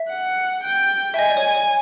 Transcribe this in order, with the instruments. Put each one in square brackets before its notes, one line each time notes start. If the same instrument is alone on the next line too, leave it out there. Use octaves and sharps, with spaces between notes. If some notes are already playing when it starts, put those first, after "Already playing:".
Already playing: [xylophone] E5
[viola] F#5
G5
[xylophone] E5
[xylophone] D#5 [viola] G#5
[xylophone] D5
C#5
C#5